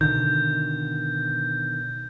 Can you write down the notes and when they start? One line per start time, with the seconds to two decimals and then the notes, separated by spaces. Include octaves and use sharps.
0.01 B2 D3 D#3 G6